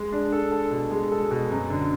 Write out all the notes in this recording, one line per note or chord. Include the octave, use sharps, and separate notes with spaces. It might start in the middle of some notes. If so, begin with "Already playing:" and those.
Already playing: G#3
D4
A4
A4
B2
G#3
A4
B2
F#2
D3